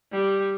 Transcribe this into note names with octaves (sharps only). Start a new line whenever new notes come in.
G3